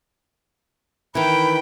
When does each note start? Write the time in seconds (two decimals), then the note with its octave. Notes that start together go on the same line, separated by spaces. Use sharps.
1.15 D#3 E3 G5 B5